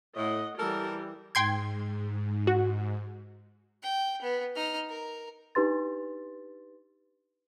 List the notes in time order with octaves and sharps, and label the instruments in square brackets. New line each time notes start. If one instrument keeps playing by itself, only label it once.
[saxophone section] A2 [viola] D#5 F#5
[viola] E3 G3 [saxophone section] A4 A#4
[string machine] G#2 [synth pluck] G5 C6 G#6
[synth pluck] F#4
[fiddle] G5
B3
D#4 F6
A#4
[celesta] D4 D#4 G4 B4 C6 A6